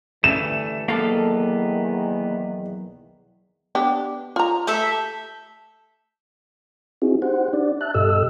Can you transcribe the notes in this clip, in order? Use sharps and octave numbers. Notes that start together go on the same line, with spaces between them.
D2 G2 E3 A3 E7
B1 E2 D#3 A#3 B3 A4 F5
B3 D4 G4
F4 A#5
A3 G4 A4 E5
C4 D#4 E4 F#4 G#4
D#4 G4 C5 F#5
D4 D5
E5 A5 F#6
G2 B2 G4 A4 D#5 E6